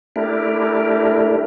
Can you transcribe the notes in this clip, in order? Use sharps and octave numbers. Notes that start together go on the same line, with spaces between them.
A3 D4 E4 G4 A#4